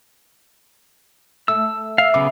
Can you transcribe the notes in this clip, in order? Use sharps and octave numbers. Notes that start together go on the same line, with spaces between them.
A3 E6
E5 F5
C#3 F#3 B3 D6